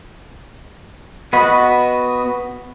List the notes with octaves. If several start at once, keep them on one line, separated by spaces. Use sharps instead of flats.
B3 F#4 D#5 B5